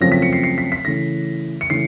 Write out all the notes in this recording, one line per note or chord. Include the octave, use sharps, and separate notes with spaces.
F#2 C#3 F3 A3 C4 A#6
B6
C#7
C7
C7
B6
B6
C#3 E3 A3 A#6
C#7
C#3 E3 A3 C7